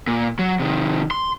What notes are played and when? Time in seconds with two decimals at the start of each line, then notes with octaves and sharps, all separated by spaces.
0.07 A#2
0.39 F#3
0.59 C3 D#3
1.11 C6